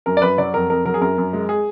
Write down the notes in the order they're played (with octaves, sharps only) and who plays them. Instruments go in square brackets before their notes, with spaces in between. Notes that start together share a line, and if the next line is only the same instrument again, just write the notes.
[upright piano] F#2 A#4
D5
F#2 B4
F#3 D5
F2 A#4
F2 A#4
F#3 A#4
G#4
F#2 A#4
F#2
G#3
G#4